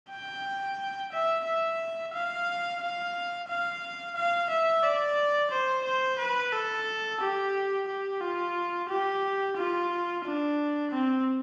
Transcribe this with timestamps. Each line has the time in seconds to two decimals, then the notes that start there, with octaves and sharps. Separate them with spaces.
0.10 G5
1.12 E5
1.45 E5
2.14 F5
2.81 F5
3.48 F5
4.15 F5
4.50 E5
4.83 D5
5.51 C5
5.85 C5
6.19 B4
6.52 A4
7.21 G4
7.88 G4
8.21 F4
8.89 G4
9.56 F4
10.24 D4
10.92 C4